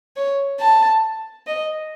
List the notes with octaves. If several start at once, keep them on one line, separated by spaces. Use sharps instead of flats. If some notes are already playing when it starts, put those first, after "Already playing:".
C#5
A5
D#5